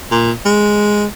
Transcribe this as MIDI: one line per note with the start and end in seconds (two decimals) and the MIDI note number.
0.11 0.32 46
0.46 1.06 56